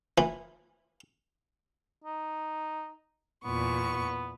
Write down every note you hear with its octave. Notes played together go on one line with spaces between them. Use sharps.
E3
D#4
E2 A#2 B3 C#6